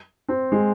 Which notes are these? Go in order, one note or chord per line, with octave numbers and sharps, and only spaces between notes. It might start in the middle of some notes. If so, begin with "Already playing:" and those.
C4
G#3